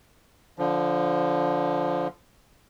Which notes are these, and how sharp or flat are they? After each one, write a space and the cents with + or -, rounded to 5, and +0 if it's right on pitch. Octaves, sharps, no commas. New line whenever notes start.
D3 -15 F3 +0